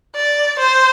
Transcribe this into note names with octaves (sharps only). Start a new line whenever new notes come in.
D5
C5